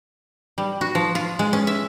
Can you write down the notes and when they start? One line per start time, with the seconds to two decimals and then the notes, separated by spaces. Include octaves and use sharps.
0.58 G3
0.81 F#4
0.95 F3
1.15 F4
1.39 G#3
1.53 C#4
1.67 E5